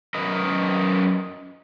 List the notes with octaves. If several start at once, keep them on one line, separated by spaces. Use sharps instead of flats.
F#2 A#4 B4 D#5